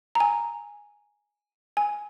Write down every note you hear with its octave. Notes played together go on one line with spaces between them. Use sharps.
A#5
G#5
G#5